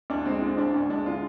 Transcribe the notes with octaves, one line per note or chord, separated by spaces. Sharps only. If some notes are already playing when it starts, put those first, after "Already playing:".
D2 D4
G#3 C4
D3
D2 D4
D2
G#3 D4
D3 F4